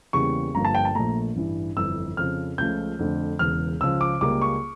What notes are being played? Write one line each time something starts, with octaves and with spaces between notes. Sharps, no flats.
E2 C#3 G3 A#3 C#6
G1 G2 F3 A#3 A#5
A5
G5
A5
A#1 A#2 A3 A#5
A1 G2 E3
G1 F2 E3 E6
F2 C#3 F3 F6
C#2 C#3 F3 A3 G6
F2 D3 A3
E1 E2 C#3 F6
C#2 C#3 F3 E6
D6
C#2 C#3 G3 A#3 D6
C#6